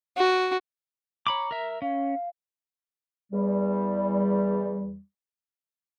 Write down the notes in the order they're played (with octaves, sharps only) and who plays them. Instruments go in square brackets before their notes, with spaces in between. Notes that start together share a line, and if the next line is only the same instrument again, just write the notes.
[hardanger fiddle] F#4
[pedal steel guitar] C#5 B5 D6 [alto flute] A#5
[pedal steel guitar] A#4 E5
[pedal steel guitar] C#4 [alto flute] F5
[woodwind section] E2 G3